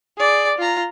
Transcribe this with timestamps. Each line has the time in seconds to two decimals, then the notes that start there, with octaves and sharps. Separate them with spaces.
0.17 G#4 D5
0.58 F4 A#5